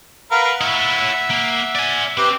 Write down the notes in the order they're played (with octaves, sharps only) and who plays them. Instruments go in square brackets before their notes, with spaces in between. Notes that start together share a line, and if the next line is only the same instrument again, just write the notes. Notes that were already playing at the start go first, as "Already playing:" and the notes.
[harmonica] A#4 B4 F5 [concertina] F#5
[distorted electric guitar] E4 C#5 [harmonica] E5
[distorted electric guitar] A#3
D5 G#5
[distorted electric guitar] C4 [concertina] G4 B4